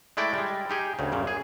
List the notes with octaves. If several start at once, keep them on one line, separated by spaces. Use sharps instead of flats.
G#3 A3 E4 D5 G5
G3 G#3
D#4 G4 G#4
D2 C#3
F#2 A#2 C#3
G#4